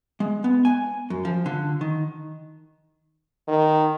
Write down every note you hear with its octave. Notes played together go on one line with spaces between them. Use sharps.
G#3
B3
G#5
F#2
F3
D3
D#3
D#3